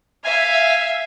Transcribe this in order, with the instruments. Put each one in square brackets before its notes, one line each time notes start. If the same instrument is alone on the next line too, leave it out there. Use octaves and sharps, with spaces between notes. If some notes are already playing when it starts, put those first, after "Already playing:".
[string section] E5 [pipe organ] F5 G#5